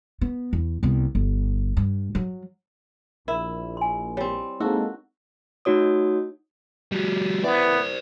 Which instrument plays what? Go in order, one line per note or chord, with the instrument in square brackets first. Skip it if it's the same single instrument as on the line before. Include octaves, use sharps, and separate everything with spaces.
[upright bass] B3
E2
C2 B3
G1
G2
F#3
[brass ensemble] A#1 [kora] E4 [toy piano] A#4
[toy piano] G#5 C6
[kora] G3 C4 [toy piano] C#5
[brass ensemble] G#3 A#3 A4 [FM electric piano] C4 D#4 [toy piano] E4 E6 [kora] F#4
[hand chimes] A3 D#4 F#4 C#5 D#6
[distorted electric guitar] G3 F#4
[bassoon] E3 [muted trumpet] B3 [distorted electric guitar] C5 D5